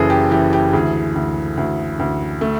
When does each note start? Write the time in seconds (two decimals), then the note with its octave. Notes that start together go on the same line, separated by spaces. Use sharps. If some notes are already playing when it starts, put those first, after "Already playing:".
Already playing: F#1 C#3 E3 G#4 A4
0.10 G4
0.31 E3 G4
0.53 G4
0.73 D2 G#4
1.15 D2
1.57 D2
1.99 D2
2.41 A3